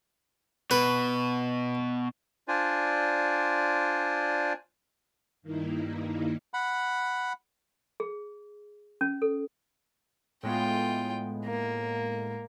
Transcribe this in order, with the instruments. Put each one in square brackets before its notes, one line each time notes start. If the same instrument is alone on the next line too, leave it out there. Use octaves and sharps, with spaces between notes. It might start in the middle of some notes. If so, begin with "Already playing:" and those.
[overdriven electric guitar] B2 [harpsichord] B4
[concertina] D4 F4 C5 D5 G#5
[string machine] G2 D#3 A#3 D#4 E4
[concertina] F#5 B5
[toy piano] G#4
C#4
A4
[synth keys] A2 G#3 B3 [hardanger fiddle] F4 G5
[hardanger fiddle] A#3